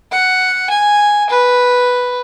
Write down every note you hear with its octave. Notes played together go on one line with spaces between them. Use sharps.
F#5
G#5
B4